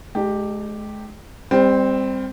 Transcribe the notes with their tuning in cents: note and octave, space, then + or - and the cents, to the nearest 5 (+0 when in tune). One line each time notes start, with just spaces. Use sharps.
G#3 +40 D#4 -35 G4 +0
G3 +35 C4 +0